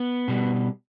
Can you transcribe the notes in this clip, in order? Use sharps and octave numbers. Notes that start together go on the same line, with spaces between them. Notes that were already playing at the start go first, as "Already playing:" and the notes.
Already playing: B3
B2 G3